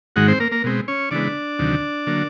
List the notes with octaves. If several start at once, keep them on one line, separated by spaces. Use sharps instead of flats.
G#2 D#3 G#3 F#4 F#5
C4 C5
A#3 A#4
A#3 A#4
B2 G#3 C4
C#4 C#5
C#3 E3 G#3 B3 D4 D5
D2 C3 D#3 F#3
D3 F#3 A#3